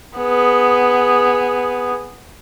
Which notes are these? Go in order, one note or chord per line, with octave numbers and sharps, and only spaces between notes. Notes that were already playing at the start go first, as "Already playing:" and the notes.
B3 G#4